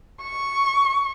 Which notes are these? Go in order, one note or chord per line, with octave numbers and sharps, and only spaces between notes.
C#6